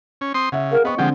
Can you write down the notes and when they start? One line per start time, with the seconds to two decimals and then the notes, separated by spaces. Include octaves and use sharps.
0.21 C#4
0.34 C4 C6 D#6
0.52 C#3 E5 F#5
0.71 G#4 A#4 F5 F#5
0.85 B3 C4 D#5 C#6
0.98 D3 F3 G#3 C4 G4 F#5